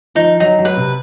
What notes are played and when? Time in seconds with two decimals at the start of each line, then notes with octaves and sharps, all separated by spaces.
0.15 F3 D#4
0.40 F#3 D#4
0.59 F#3
0.65 B4
0.77 C3